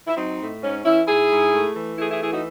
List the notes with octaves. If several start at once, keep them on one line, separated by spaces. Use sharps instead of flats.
E4
F#3 C4 D#4
A2
G#2 C#4
E3 C#4 E4
G#2 E4 G#4
G#2
A3
E3
A3 E4 G#4
E4 G#4
E3 E4 G#4
D#4 F#4